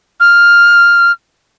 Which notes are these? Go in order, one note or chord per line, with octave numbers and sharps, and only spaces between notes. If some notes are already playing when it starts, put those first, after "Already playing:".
F6